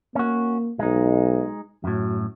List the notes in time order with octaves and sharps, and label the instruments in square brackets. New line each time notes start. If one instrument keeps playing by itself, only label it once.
[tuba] A#3 [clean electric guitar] C#4 F#4
[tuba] B1 [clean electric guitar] G#3 D#4
[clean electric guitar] F#2 A2 [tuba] F#3